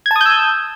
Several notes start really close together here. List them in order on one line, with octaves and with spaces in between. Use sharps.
G#6 A5 D#6 G6 E6